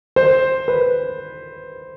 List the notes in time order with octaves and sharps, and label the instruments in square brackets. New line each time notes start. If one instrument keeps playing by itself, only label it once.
[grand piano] C5
B4